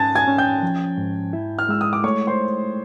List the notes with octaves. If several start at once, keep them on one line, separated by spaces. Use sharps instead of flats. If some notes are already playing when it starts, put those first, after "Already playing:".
Already playing: G#2 C#4 G#5 A5 G#6 A6
G#5 G#6
C#4
G5 G6
F3
G#2
E4
F6
G#3 E6
D#6
D6
A3 C#5 C#6
C5 C6